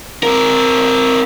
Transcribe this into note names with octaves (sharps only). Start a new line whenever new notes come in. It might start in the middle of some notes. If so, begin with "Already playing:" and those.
C4 A#4